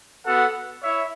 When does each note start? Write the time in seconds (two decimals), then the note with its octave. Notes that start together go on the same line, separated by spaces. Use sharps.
0.25 B3 F#4 A4 F#5
0.83 E4 C#5 E5